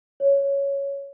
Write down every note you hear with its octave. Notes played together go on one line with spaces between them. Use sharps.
C#5